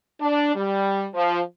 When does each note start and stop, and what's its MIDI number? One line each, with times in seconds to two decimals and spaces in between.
0.21 0.53 62
0.56 1.06 55
1.14 1.40 53